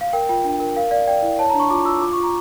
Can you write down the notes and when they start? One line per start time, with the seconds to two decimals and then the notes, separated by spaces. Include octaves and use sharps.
0.01 F5
0.13 A#4 G5
0.29 F4 G5
0.44 D4
0.60 A#4
0.76 A#4 F5
0.91 D5 F5
1.08 D5 G5
1.22 E4
1.39 C#5 A5
1.50 A#5
1.54 D4
1.60 C#6
1.70 F4 D6
1.85 F4 E6
2.01 F4 D6
2.13 F4 C#6
2.23 A#5